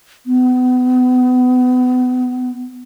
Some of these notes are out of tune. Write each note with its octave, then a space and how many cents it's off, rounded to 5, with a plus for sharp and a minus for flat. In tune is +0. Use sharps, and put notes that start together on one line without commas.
B3 +30